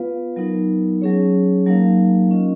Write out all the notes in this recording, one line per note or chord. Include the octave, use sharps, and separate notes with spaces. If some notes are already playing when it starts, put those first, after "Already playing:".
Already playing: B3 F4 B4 F5
F#3 B3 D#4 A#4
F#3 C#4 G#4 C#5
F#3 A#3 D#4 A#4 F5
C#4 F4 A#4 D#5